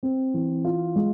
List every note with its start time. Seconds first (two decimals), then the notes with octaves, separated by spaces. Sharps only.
0.03 C4
0.34 E3
0.65 F4
0.96 G#3